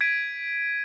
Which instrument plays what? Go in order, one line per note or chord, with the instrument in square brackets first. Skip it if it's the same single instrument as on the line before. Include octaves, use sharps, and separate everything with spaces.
[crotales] G#6 B6 D7 D#7